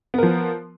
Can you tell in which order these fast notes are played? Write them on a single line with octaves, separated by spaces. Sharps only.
B3 A#4 F3